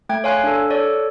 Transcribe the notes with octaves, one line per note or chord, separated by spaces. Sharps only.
A3 G5 G#6
C#5 F5 G#5 C6 F#6
D4 A4
A4 C#5 D5